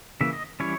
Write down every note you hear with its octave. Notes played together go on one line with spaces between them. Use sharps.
C#3 E3 A#3 E5
D#5
E3 G3 C#4 E4 C#5